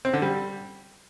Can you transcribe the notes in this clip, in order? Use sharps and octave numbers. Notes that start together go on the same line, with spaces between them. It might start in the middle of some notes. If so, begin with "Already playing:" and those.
C4
D3
G3